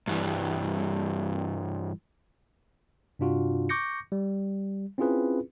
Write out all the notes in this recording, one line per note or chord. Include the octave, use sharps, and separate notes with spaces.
G2 E3 G3
G2 C3 D4 F4 F#4
C#6 D6 G6 A#6 C#7
G3
C4 C#4 E4 F4 G#4 B4